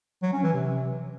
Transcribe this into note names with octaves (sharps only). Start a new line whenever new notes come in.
F#3
C#4
E3
C3